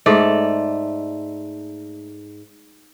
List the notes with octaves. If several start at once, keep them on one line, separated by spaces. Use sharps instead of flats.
G#2 A3 D5